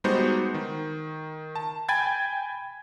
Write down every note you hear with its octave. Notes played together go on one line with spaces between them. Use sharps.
G3 G#3 B3 D#4 F#4 C5
D#3
A5
G5 G#5 B5 G#6 A6